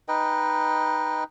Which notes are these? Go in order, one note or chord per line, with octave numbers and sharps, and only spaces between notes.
D#4 B4 D#5 G5